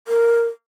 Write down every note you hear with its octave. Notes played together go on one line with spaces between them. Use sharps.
A#4